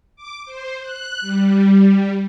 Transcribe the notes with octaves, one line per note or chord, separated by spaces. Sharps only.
D6
C5
F#6
G3